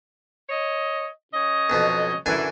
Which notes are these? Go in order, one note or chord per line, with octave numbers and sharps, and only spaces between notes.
C#5 D#5
C#3 C#5 D#5
B1 F2 B2
F#2 D3 E3 G#5